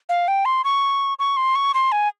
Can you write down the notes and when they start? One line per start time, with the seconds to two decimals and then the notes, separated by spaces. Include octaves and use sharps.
0.09 F5
0.28 G5
0.45 C6
0.64 C#6
1.19 C#6
1.37 C6
1.55 C#6
1.74 C6
1.92 G#5